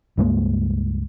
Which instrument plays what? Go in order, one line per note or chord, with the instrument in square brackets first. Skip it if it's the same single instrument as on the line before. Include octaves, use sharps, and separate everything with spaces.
[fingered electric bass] C#2 G2 G#3 A#3